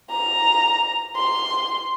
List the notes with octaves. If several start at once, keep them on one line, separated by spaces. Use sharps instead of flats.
A#5
C6